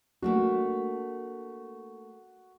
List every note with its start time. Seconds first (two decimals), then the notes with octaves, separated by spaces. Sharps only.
0.22 A3 A#3 D4 F#4